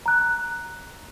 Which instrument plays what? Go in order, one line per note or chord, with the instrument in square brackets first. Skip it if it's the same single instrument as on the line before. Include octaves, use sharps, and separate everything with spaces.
[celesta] A#5 F#6